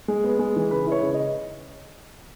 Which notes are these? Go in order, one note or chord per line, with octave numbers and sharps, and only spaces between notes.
G#3
B3
G#3
E3
C#3 B4
E4 B4 C#5
C#3
D#5